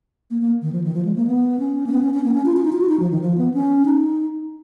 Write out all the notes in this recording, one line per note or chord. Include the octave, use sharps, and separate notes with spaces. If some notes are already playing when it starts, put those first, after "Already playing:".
A#3
A#3
D#3
F3
D#3
F3
G#3
A#3
B3
C#4
A#3
B3
C#4
C#4
A#3
C#4
F4
F4
D#4
F4
F#4
D#4
F3
D#3
F3
B3
C#4
D#4